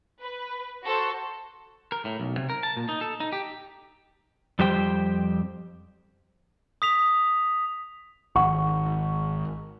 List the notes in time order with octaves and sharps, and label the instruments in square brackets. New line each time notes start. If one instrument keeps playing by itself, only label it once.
[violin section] B4
F#4 A4 C5
[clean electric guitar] A#4
A2
B1
C3
A#4
A5
A#2
D#4
A4
D#4
G4
[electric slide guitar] F2 G3 G4 C5 G5
[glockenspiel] D#6 B6 F7
[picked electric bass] G#1 [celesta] F#5 [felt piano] C#6